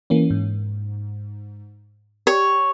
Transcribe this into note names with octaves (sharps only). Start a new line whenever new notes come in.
E3 A#3 C#4
G#2
G4 C#5